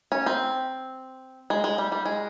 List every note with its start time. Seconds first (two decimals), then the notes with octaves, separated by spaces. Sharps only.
0.12 C#4
0.26 C4
1.50 G#3
1.64 G#3
1.78 G3
1.92 G3
2.06 G#3